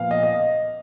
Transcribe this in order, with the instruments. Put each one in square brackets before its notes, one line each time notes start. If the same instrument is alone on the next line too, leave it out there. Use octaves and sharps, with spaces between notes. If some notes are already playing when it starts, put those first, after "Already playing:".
Already playing: [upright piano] A#2 F3 B3 [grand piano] F5
[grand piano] D#5
D#5